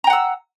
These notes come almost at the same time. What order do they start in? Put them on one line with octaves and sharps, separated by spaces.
A#5 G5 F#5 E6